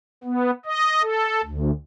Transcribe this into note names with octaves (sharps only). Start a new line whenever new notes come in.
B3
D#5
A4
D2